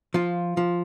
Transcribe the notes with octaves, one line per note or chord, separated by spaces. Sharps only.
F3 F4
F3